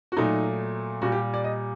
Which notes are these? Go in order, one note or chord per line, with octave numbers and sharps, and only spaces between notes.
F#4
A#2 F#3 A3 D#4
A#2 G3 F#4
G4
D5
D#5